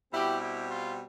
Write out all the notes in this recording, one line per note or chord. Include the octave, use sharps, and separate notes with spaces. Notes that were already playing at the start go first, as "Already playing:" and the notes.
B2 G3 C4 E4 G4
E4 G4
F4